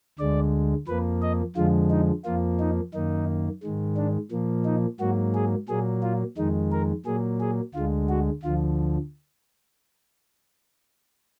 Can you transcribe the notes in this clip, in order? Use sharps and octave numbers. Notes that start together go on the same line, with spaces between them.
D2 D3 G#3 D5
F2 F3 A#3 B4
D#5
F2 D3 F3 G#3 F4
D#4
F2 F3 A#3 F4
D#4
F#2 D#3 A#3 D#4
G#2 D#3 G#3
D4
A#2 F3 A#3
D#4
G#2 F#3 A#3 F#4
G#4
A#2 F#3 A#3 G#4
F4
F2 D#3 G#3 D#4
A#4
A#2 F#3 A#3 G#4
G#4
D2 D3 G#3 F4
F#4
D2 D3 F3 F4